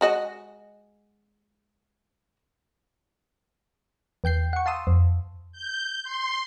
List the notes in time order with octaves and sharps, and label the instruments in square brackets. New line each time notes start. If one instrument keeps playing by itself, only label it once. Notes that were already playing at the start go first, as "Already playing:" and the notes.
[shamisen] G#3 F#4 D#5
[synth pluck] E2 G5 G6 C7
F#5 C#6
F5 A5 C6 D#6 E6
F2
[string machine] G6
C6